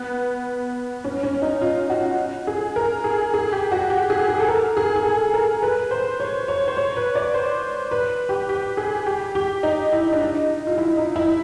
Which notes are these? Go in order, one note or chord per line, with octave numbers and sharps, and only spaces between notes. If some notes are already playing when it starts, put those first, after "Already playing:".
Already playing: B3
C#4
C#4
D#4
F4
F#4
G#4
A#4
G#4
G#4
G4
F#4
G4
G#4
G#4
A4
A#4
G#4
G#4
A4
A#4
B4
C5
C#5
C#5
C5
C#5
B4
D5
C5
B4
G4
G4
G#4
G4
G4
D#4
E4
D4
D#4
F4
E4
D#4
E4